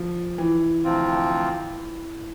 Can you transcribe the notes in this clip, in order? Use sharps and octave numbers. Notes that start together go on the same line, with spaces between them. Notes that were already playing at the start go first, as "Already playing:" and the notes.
Already playing: F3
E3
D2 C3 F3 C4 F4